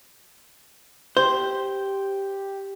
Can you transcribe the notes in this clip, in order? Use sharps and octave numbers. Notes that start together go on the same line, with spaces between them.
G4 C5